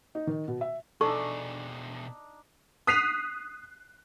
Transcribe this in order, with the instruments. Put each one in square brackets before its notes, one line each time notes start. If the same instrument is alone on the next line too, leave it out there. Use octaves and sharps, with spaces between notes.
[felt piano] D#4
D#3
B2
E5
[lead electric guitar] B2 G#4 [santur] D4 D#4 [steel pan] A4 [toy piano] C#6
[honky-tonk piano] D#6 F#6 B6 C7 D#7 F7